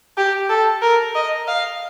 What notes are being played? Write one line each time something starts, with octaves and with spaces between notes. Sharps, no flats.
G4
A4
A#4
D#5
F5